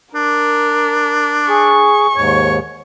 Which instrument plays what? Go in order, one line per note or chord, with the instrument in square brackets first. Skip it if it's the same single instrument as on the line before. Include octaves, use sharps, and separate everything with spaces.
[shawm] D4 [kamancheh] A#4
[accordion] G#4 [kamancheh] C#6
[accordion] D#2 G#2 [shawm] C#5